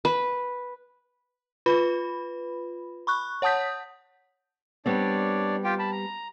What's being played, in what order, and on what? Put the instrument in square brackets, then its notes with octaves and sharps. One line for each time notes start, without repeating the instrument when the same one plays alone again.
[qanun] B4
[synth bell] F4 B4 B5
B5 C#6 F#6
C#5 F#5 A5 D#6 G6 B6
[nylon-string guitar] G3 B3 C4 [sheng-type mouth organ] D4 C#5 D5
[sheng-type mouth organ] F4 G4 G5
A5 B5
A#5